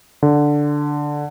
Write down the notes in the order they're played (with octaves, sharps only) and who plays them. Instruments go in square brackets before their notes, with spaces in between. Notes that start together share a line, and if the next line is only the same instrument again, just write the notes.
[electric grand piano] D3